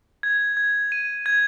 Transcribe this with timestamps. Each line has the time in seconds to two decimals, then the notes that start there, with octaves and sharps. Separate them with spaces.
0.23 G#6
0.57 G#6
0.92 D#7
1.26 G#6